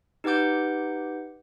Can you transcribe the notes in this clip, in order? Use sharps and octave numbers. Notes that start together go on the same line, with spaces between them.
D#4 G4 B4 F#5 D6 G6